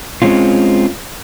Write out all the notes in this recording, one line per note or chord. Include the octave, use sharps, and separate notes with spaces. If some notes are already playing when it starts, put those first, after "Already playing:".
G#3 C4 C#4 F4